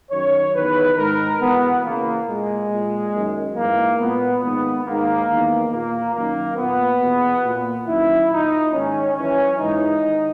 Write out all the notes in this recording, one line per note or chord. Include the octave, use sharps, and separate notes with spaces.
F#2 D#3 C#5
E2 D#3 B4
G#2 D#3 A#4
E2 B2 B3
E2 C#3 E3 A#3
A#2 G#3
A#2
F#2 D#3
G#2 E3 A#3
A#2 B3
G#2 D#3 B3
G#2 D#3 A#3
E2 D#3
A#2 A#3
F#2 D#3 A#3
A#2 B3
E2 B2
A#2
F#2 D#3 E4
A#2 D#4
G#2 D#3 C#4
F#2 E3 C#4
G#2 E3 D#4
D#3